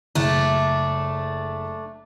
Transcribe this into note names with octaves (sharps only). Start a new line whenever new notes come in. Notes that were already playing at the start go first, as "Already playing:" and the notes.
F#1 A3 D4